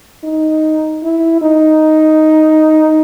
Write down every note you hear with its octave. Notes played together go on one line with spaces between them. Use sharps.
D#4
E4
D#4